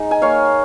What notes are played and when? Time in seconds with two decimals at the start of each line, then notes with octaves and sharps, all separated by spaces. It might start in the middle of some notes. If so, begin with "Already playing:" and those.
Already playing: G#3 D#4
0.11 G#5
0.22 A#3 C#5 F5